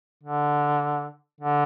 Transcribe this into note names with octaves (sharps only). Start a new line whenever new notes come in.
D3
D3